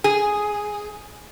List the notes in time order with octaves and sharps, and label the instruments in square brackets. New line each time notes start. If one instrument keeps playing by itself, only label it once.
[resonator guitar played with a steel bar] G#4